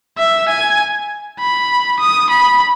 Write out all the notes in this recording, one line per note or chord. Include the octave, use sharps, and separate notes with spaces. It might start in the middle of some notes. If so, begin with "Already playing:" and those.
E5
G#5
B5
D#6
B5